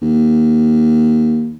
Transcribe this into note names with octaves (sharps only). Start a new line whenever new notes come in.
D#2